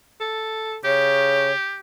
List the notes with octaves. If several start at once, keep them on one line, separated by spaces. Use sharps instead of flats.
A4
C#3 G4 C#5